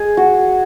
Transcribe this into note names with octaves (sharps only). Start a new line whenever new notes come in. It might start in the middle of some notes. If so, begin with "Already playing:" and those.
Already playing: G#3 G#4
F#4